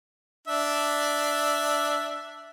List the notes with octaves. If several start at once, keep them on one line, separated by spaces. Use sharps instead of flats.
D4 E5